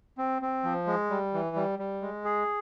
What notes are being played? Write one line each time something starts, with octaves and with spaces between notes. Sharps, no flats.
C4
C4
F3
G#3
G3
E3
G3
G3
G#3
G#4